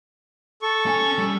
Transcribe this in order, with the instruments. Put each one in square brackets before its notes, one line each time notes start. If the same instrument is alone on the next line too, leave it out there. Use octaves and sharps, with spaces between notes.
[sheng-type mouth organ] A4 C#6
[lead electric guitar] C#4 G#5
G3